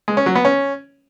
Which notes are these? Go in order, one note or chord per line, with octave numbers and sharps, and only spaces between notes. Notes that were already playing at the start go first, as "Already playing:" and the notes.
G#3
C#4
F#3
B3
C#4